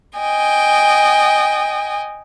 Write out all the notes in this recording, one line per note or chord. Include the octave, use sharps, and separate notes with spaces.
D#5 G5 G#5